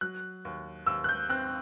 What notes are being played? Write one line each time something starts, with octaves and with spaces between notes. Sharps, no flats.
F#3 F#6
D#2
D#2 E6
F#6
G6
C4 F#6